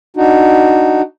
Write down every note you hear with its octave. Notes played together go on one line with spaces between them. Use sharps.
D4 D#4 F#4